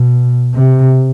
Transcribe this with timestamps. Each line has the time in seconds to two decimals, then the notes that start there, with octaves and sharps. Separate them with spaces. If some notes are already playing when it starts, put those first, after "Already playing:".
Already playing: B2
0.54 C3